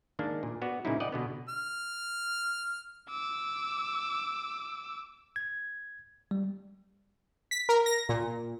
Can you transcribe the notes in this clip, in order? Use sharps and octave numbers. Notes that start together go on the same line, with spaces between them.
D#3 G#3 A#3 D4
A#2
B3 F#4 D5
A#2 C#3 G#3 C#4 D#4 E4
D5 D#5 F#5 G5
B2 D3 B3
F6
D6 E6
G#6
G3
B6
A#4
A#6
A#2